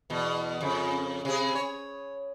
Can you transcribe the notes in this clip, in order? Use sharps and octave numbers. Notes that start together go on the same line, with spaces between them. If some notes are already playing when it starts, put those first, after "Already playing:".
E2 B2
F2 C#3
C3 G#4
C#5